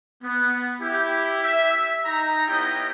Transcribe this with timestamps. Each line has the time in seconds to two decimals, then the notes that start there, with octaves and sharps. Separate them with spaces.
0.22 B3
0.80 E4 G4
1.44 E5
2.05 D#4 A#5
2.48 B3 E4 G4 C#5 D#5 G5